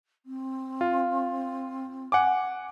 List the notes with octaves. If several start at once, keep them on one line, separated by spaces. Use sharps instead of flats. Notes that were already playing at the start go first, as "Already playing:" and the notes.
C4
F4
F#5 G#5 D6